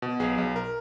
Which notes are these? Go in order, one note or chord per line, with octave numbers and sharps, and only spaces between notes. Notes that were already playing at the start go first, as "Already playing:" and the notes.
B2
B1 G#4
B1
A#4